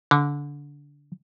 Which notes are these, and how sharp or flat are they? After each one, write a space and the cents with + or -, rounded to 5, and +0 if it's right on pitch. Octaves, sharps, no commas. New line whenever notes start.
D3 -25